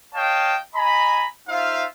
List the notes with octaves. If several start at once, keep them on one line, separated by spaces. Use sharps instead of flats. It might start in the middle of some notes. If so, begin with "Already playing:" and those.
C#5 D#5 F5 G5 A5
D#5 G#5 A#5 B5
D#4 F4 C5 E5 F5